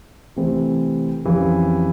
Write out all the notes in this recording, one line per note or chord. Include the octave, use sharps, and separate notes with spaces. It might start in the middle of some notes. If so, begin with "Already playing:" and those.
C3 E3 A3 C4
F2 C#3 E3 G3